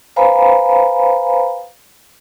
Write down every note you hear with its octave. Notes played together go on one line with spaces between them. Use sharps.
B4 C5 F5 G#5 A#5 B5